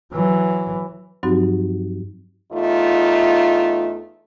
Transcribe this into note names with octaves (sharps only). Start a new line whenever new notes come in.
E3 F#3
G2 F3 F#3 C4 D#4 F#4
E2 A3 D#4 F4